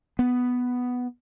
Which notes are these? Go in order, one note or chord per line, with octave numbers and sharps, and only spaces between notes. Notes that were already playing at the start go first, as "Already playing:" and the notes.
B3